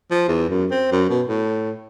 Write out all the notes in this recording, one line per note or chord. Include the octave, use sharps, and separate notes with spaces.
F3
E2
F#2
C4
F#2
B2
A2